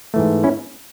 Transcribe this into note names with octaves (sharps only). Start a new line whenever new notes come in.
G#2 E3 A3
C#4 E4